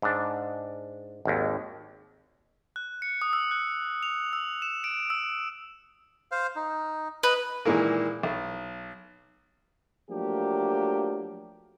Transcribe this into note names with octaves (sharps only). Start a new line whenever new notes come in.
G#2 D4
G#1 D#2
F#6
C#7
D#6
E6
F#6
F7
E6
E7
D7
E6
C5 F5
D#4
B4 D#5
A#2 D#3 E3 G#3 A#3
B1
F3 F#3 A3 A#3 D4 G4